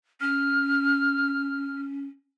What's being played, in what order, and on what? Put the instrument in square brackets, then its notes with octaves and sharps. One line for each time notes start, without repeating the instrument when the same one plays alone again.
[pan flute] C#4 [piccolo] F6